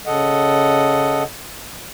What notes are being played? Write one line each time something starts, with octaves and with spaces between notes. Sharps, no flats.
C#3 A4 D#5 F#5